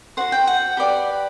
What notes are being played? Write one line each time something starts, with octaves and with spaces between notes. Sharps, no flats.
F#4 C5 F#5
G5
F#5
G4 B4 D5